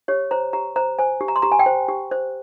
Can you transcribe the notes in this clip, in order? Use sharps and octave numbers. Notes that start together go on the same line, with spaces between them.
G4 C#5
C5 A#5
G4 A#5
C5 A#5
C5 G#5
G4
A#5
C6
G4 A#5
G#5
G5
C5
G4
C5